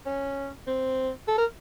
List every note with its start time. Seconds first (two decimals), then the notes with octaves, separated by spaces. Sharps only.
0.06 C#4
0.67 C4
1.28 A4
1.38 A#4